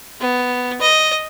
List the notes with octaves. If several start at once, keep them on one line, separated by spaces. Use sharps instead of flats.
B3
D#5